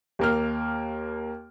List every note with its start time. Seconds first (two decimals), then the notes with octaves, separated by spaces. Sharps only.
0.19 D#2 A#3 F6